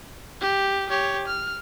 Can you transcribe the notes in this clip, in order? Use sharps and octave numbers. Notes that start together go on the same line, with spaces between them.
G4
G4 C#5
F6